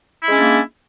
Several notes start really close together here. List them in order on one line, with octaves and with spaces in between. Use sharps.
E4 G#3 C#4 D4 A#3